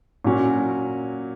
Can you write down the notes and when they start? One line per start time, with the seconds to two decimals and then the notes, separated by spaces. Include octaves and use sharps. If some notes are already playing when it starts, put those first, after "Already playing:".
0.24 A#2 F#3 C#4 F#4